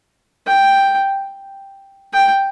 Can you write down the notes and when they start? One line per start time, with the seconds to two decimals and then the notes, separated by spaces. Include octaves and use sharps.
0.47 G5
2.13 G5